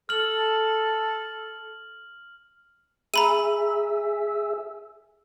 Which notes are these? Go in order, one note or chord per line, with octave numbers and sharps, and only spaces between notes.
A4 F6 F#7
G#4 E5 A#5 B5 D#7